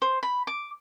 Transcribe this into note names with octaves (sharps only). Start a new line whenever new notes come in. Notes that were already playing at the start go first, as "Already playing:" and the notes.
C5
B5
D6